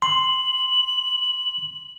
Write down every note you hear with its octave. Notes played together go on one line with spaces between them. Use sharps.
C6 F#7